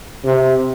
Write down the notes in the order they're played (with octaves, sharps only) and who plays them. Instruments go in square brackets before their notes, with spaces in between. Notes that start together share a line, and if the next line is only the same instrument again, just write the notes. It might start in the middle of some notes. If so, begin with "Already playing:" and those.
[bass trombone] C3